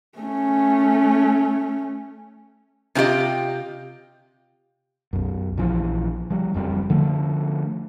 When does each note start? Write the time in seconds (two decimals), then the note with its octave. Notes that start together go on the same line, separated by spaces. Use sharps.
0.18 A3 C#4
2.95 C3 C4 F4 G4 D#5
5.13 B1 F#2
5.58 A#1 E3 F3
6.30 F3 G3
6.54 F#1 F2 C#3 G3
6.90 D3 F3 A3